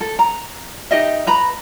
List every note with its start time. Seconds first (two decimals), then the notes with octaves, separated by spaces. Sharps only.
0.01 A4
0.19 A#5
0.91 D#4 G4 D#5 E5
1.27 B4 A#5 B5